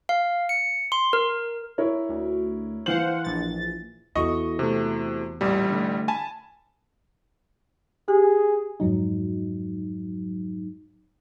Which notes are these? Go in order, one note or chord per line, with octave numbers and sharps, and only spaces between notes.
F5
C#7
C6
A#4
E4 A#4 C#5
D2
E3 C5 F5 F#5 F#7
A#1 A6
E2 E4 F#4 A4 D#5 C#6
C3 A3
A1 A#2 G3
D3 A3
G#5 A5 B5
G4 G#4
F2 G#2 F#3 D#4